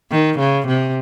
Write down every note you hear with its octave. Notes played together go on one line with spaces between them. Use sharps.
D#3
C#3
C3